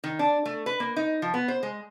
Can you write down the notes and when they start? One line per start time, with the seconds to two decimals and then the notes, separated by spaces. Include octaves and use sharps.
0.04 D#3
0.19 D4
0.45 A3
0.66 B4
0.80 A#3
0.96 D#4
1.22 F3
1.34 B3
1.48 C5
1.63 G#3